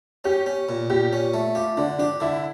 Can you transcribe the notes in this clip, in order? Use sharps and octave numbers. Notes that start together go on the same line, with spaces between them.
C#4 G4
C#4
A#2
A#2 G4
C#4
A3
F4 G4
D3 D4
D4 G4
D3 E4